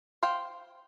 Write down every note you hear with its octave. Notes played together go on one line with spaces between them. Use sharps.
C5 F5 G5